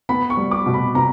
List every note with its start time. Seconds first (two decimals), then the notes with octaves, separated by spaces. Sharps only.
0.09 B3 B5
0.30 C#6
0.37 G3
0.51 D6
0.66 B2
0.74 B5
0.95 B2 A#5